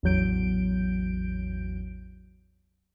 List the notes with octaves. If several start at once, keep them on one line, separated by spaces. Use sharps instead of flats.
A1 E2 F#3 G6 D7